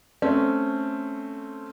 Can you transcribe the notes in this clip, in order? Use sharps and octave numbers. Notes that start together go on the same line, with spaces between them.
A3 C4 C#4